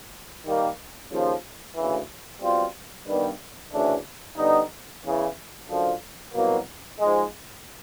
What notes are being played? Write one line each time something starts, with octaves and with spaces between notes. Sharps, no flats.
D#3 G3 A#3
D#2 C#3 F3
D2 C#3 E3
B2 G3 C4 F4
G2 D#3 G3 B3
D2 C#3 E3 A3 D4
D3 G3 B3 D#4
E2 C#3 E3
F#2 D3 F3
C2 B2 F#3 A#3
G#2 F3 G#3